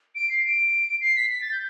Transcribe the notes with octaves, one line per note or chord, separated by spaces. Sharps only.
D7
C7
D7
C7
B6
B6
A6
G6